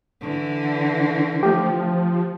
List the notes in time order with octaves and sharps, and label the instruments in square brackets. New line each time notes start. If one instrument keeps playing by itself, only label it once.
[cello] D3 E3
[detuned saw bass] F3 [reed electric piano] A3 G4